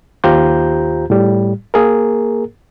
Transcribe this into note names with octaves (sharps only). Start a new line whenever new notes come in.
D#2 F4 G4 C5 A#5 G6
A2 G3
A#3 G#4 A#4